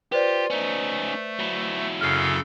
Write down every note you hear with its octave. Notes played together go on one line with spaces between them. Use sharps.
F4 G4 B4 C5 D5
A3 C#4 D#4
F#3 E4
F#2 C#3 A4 F6 C7